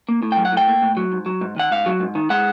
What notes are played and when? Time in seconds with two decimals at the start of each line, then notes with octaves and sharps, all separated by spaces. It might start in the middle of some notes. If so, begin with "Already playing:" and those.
0.09 A#3
0.23 A2
0.32 G5
0.37 F#3
0.45 F#5
0.52 A2 G5
0.68 A#3
0.82 A2
0.97 F#3
1.12 G#2
1.26 F#3
1.41 G#2
1.56 D#3 F#5
1.71 G#2 F5
1.86 F#3
2.00 G#2
2.15 D#3
2.30 G#3 F#5